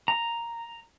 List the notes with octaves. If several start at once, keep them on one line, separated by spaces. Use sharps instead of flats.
A#5